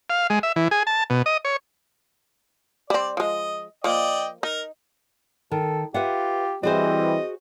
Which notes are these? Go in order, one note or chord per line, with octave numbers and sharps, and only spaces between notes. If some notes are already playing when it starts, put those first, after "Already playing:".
F5
G#3
E5
E3
G#4
A5
B2
D#5
C#5
G3 C4 D5
F3 G#3 D#5
F3 A#3 D5 D#5 G5
D#4 A#4
D#3 A4
F4 G4 B4 E5 F#5
E3 G3 C4 F#4 G#4 C5 D#5